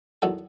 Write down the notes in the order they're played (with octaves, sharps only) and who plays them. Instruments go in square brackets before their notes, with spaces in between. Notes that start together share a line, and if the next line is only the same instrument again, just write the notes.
[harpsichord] E2 D#3 F#3 B3 F#4 A4